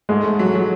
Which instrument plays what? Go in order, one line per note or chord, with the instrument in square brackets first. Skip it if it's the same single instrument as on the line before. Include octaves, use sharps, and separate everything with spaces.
[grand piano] G#2 G#3 [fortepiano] A3
[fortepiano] A3
F#3
F#3